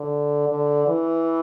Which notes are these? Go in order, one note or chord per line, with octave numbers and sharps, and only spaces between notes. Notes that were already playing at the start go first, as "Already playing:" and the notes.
Already playing: D3
D3
E3